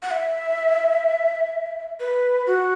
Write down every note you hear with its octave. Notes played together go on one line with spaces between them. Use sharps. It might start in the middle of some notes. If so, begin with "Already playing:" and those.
F#5
E5
B4
F#4